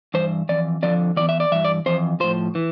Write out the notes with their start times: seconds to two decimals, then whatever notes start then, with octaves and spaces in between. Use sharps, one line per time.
0.14 G2 E3 C5
0.49 F2 E3 D5
0.83 F2 D3 F3 D5
1.17 E2 C3 E3 D5
1.29 E5
1.40 D5
1.52 G2 E3 E5
1.65 D5
1.86 F2 E3 C5
2.20 A2 F3 C5
2.55 E3